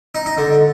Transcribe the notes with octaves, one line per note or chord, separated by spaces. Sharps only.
D#4
D#4
D3